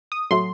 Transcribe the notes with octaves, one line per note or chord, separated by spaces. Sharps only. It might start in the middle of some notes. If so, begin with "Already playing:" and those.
D#6
A2 F#3 A3 C6